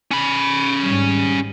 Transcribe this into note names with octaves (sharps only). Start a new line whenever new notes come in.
C#4 B5
G#1 G#2 G3